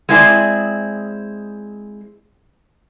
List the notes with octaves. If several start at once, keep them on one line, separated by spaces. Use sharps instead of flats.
G#3 C4 E4 G#4 B4 D5